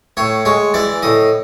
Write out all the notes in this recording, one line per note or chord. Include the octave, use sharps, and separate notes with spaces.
A2 C#5
G#3 C#5
E3 D5
A2 D#5